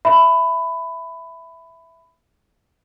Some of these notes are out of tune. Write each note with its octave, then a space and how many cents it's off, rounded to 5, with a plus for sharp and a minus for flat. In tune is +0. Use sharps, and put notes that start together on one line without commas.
E5 +0 B5 +15